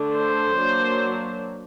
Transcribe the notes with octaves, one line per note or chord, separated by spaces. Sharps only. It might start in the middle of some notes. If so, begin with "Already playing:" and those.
Already playing: D3 A3 D4
C5
F#3 A#3 D4